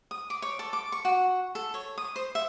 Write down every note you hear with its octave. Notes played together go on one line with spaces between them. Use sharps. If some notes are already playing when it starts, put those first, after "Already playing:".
D#6
D6
C#5
A4
D6
C#6
F#4
A4
C#5
D#6
C5
E5